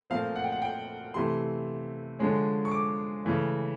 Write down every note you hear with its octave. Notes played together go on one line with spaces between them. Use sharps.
A#2 F3 A3 C4 F5
F#5
G5
F#5
G5
C3 E3 A3 C6
D3 F3 G#3 C#4
C#6
D6
C#3 E3 A3